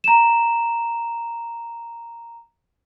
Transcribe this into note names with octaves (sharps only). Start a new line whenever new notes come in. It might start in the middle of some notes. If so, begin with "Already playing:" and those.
A#5 E7